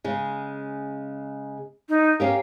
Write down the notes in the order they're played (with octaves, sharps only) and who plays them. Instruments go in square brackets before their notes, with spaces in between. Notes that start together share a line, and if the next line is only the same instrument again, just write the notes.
[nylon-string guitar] C#3 G#3
[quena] D#4
[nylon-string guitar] C#4 G4 A#4 [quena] F5